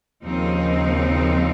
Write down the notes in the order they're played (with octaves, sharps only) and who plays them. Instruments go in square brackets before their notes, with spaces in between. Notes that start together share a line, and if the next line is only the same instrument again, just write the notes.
[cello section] D#2 C#3 F3 C4 D#4